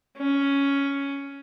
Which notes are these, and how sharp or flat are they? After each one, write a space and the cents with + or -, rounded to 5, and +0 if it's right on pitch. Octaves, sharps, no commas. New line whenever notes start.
C#4 +5